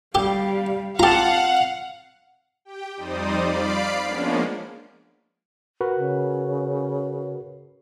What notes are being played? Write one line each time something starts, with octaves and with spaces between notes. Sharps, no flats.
G3 G4 F5
C4 F4 G4 F5 F#5 A5 A#5
G4 G5
F2 G3 D#4 C5 D5 D#6
D5 F5 B5 C7 D7
F3 G#3 A#3 B3 C#4 D4
F#4 A#4 B4
C#3